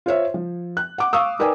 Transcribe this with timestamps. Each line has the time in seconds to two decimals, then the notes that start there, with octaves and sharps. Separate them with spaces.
0.06 F4 C5 C#5 E5
0.34 F3
0.77 F#6
0.98 F#5 D6
1.13 F5 C#6 D#6 E6
1.39 D#4 A#4 B4 D5 G5 G#5